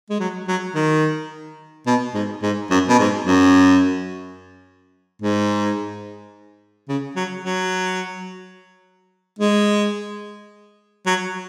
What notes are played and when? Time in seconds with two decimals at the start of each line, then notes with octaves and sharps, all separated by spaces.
0.10 G#3
0.20 F#3
0.48 F#3
0.75 D#3
1.86 B2
2.14 G#2
2.43 G#2
2.70 F#2
2.89 B2
2.99 G#2
3.26 F#2
5.22 G#2
6.89 C#3
7.16 F#3
7.44 F#3
9.39 G#3
11.06 F#3